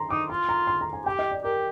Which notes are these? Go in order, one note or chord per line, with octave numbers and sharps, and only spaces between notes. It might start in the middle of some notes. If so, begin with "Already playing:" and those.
Already playing: A#5 C6
D#4 D6
F4 C6
A#5
C6
A#5
G#5
G4 G5
D#5
D5
G4 A#4